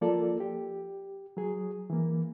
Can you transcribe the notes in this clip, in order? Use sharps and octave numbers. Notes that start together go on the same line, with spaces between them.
F3 A#3 F4 A4 D5
G4
F#3 G#4
E3 A#3